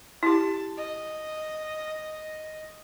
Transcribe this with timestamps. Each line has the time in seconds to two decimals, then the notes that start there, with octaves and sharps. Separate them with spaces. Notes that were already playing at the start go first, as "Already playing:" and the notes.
0.23 E4 G4 A5
0.77 D#5